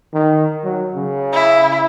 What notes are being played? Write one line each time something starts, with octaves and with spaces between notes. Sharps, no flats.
D#3
F#3
C#3
E4